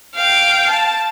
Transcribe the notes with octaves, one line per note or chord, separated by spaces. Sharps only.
F5 G5
A5